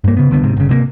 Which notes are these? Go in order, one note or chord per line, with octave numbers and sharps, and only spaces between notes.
G2 A#3
C#3 B3
C2 D3 B3
G#2 C3
G1 C#3
C3 E3 A#3